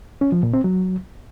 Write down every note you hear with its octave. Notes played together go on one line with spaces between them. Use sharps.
C#4
F3
A#2
C4
F#3